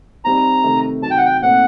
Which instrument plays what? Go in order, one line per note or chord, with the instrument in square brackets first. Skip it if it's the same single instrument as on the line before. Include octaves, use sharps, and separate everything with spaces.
[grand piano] G3 C4 D#4 [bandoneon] A#5
[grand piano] C3 D#3 A3
[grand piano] C3 D#3 F#3 [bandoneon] A5
[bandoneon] G5
F#5
G5
[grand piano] A#2 A3 C4 D#4 [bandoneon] F#5